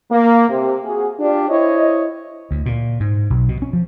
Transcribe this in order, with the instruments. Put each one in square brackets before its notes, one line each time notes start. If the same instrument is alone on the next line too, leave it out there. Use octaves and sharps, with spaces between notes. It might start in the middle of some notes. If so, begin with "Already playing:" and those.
[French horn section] A#3
C3
F#4 G#4
D4 F4 G4 D5
E4 C5 C#5 D#5
[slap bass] D2
A#2
G#2
B1
B2
C#4
F3